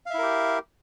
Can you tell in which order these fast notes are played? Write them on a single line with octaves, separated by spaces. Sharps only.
F5 E5 E4 A#4 G4